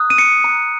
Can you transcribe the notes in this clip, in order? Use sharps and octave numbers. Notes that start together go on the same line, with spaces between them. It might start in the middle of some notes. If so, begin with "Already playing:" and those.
Already playing: A#5 D#6 F#6
D#7
C#7
A#5 D#6 F#6